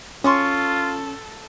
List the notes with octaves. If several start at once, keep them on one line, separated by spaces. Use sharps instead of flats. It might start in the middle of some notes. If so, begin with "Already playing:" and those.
C#4 F4 A4 C6 C#6 D#6